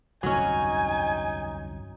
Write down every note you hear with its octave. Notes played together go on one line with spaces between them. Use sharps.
G1 C2 F2 F#3 C#4 D#4 G#5